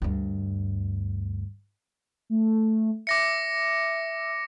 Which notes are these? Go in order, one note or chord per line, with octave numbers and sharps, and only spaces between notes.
D2 G2
A3
E5 D6 A#6 C#7